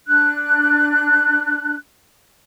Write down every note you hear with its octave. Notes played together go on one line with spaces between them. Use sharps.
D4 F#6